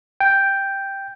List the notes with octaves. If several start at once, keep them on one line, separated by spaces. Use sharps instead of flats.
G5